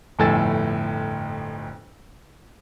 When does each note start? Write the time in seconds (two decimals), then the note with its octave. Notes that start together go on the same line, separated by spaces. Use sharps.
0.19 G1 F2 A2 G#5 E6 A6